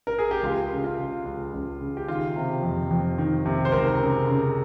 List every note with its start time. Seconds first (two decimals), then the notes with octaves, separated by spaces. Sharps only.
0.07 A#4
0.19 G#4
0.31 G4
0.43 C#2 F4
0.71 C#3
0.84 F4
0.99 C#3
1.25 C#2
1.54 C#2
1.81 C#3
1.97 G4
2.08 D#3 F4
2.36 C3
2.63 F2
2.91 F2
3.18 D#3
3.46 C3
3.65 C5
3.72 C#2 A#4
4.00 C#3
4.28 C#3